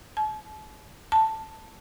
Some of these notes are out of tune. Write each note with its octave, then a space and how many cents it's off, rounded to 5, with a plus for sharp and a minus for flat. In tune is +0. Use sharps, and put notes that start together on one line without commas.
A5 -40
A5 +5